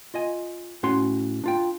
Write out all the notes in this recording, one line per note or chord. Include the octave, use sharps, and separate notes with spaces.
F4 D#5 G#5
A2 C#4 F#4 C6
D4 F4 G5